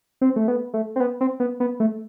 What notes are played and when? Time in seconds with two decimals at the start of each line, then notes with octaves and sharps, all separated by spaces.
0.21 C4
0.36 A3
0.48 B3
0.74 A3
0.96 C4
1.00 B3
1.21 C4
1.40 B3
1.60 B3
1.80 A3